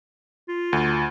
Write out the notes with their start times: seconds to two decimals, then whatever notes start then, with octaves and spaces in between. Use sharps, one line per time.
0.48 F4
0.73 D2